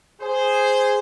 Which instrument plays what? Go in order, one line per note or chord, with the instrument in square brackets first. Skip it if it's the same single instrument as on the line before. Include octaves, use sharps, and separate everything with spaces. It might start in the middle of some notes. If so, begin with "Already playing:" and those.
[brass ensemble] G#4 C5